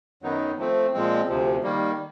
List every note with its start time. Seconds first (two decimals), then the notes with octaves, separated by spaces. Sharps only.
0.22 F#2 D#3 F#3 B3 D#4
0.58 F3 A3 C4
0.94 A#2 F3 G#3 C4
1.28 D2 C3 F3
1.63 D#3 G3 A#3